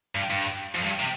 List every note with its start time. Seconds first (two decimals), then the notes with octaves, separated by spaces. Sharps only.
0.15 G2
0.30 G2
0.75 F2
0.84 G2
1.00 C3